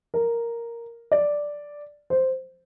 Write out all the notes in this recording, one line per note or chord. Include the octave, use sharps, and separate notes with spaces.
A#4
D5
C5